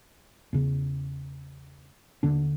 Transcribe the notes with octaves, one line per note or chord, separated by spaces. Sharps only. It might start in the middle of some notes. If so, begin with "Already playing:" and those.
E2 C#3
D#2 D3 D4